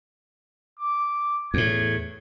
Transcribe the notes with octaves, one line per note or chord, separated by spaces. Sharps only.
D6
E2 A2 G#6